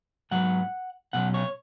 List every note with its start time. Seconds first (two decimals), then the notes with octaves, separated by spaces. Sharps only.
0.31 G#2 F#3 B3 F#5
1.13 B2 F#3 C#4 F#5
1.34 C#5